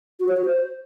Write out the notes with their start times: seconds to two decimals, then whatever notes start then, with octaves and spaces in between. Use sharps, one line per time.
0.20 F#4
0.28 C#5
0.37 F#4
0.45 C5